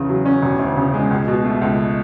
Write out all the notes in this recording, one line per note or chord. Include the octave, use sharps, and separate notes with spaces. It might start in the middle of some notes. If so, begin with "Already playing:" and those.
Already playing: E2 C#3
F#3
C#4
E1
D2
C#3
G#3
C#2
B2
A3
C#2